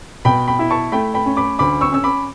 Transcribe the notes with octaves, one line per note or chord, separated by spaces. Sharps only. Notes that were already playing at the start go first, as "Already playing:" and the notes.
B2 G5 B5
G5 B5
E4
A5 C#6
A3 G5 B5
G5 B5
C#4
B5 D6
D2 B5 D6
C#6 E6
C#4 E6
B5 D6